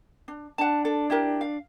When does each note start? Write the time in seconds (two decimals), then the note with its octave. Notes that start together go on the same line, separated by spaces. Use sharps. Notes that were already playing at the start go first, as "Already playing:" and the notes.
0.28 D4
0.58 D4 F#5 A5
0.85 A4
1.10 E4 G4 A#4
1.41 F5